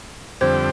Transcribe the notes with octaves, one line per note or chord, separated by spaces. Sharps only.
F2 D3 G3 C4 G4 C5